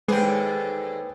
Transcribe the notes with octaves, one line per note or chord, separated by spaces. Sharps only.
D#2 D3 G#3 G#4 B4 C5 G5